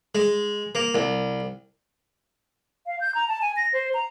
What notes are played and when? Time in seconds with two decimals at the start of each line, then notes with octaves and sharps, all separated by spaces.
0.15 G#3
0.75 A#3
0.95 C2
2.86 F5
3.00 G6
3.15 A#5
3.28 A5
3.42 G#5
3.57 A#6
3.73 C5
3.94 A#5